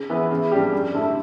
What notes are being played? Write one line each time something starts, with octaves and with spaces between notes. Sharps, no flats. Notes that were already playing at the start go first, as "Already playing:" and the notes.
Already playing: C#3
E3 B3 E4 B4
C#3
G3 D4 G4
F#2
D3 A3 E4 A4